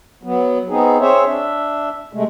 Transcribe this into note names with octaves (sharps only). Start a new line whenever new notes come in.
F#3 B3
B3 C4 D#4 G#4
C4 G#4 C5 C#5 E5
D4 E5
C3 G#3 A3